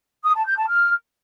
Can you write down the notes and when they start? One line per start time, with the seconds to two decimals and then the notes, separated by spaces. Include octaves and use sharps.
0.24 D#6
0.35 A5
0.46 G6
0.57 A5
0.68 F6